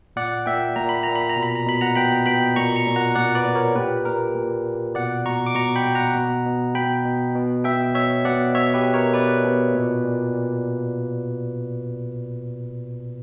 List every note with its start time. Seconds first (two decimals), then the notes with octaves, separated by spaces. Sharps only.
0.16 A#2 D5 F#5
0.46 A#2 E5 G5
0.76 A#2 A#5
0.89 B5
1.03 A#2 A#5
1.15 B5
1.29 A#5
1.36 B2
1.43 B5
1.55 A#5
1.66 B2 B5
1.81 F#5 A#5
1.95 B2 G5 B5
2.26 B2 G5 B5
2.56 A#2 A#5 C#6
2.76 A#5 C#6
2.86 A#2
2.96 F#5 A#5
3.15 A#2 D5 F#5
3.35 B4 D5
3.45 A#2
3.55 A#4 C#5
3.76 A#2 G4 B4
4.05 A#2 A#4
4.35 A#2
4.65 A#2
4.95 B2 D5 F#5
5.25 B2 A#5 C#6
5.46 D6
5.55 B2 A#5 C#6
5.76 G5 B5
5.86 B2
5.95 F#5 A#5
6.15 B2
6.46 B2
6.75 B2 G5 B5
7.05 B2
7.35 B2
7.64 B2 E5 G5
7.95 B2 C#5 E5
8.25 B2 D5 F#5
8.54 B2 C#5 E5
8.74 G4 B4
8.84 B2
8.94 A#4 C#5
9.14 B2 B4 D5
9.44 B2
9.75 A#2
10.04 A#2
10.35 A#2